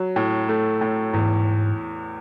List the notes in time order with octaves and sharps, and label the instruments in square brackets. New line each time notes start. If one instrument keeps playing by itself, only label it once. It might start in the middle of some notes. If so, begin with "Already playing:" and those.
Already playing: [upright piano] F#3
A2
A3
A2
[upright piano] E2 [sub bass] G#2